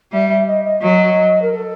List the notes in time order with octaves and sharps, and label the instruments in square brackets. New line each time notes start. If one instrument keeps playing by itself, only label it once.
[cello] G3 [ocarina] E5
[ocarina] E5
D#5
D#5
[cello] F#3 [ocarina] D#5
[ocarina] A#4
A4